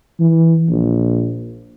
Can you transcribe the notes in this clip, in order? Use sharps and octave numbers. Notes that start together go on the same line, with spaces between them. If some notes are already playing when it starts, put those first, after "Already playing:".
E3
A#1